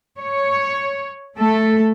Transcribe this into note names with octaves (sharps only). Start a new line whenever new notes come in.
C#5
A3 A4